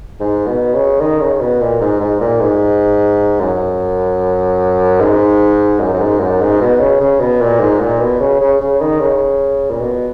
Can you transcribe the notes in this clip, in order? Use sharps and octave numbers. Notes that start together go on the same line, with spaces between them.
G#2
B2
C#3
D#3
C#3
B2
A#2
G#2
G#2
A#2
G#2
F#2
G#2
F#2
F#2
G#2
F#2
G#2
B2
C#3
C#3
B2
A#2
G#2
A#2
B2
C#3
C#3
C#3
D#3
C#3
A#2
B2